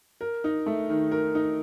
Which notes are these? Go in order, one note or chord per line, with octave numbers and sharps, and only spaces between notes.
A#4
D#4
A3
D#3
A#4
D#4